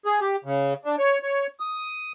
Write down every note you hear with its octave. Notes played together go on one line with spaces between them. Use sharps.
G#4
G4
C#3
D4
C#5
C#5
D#6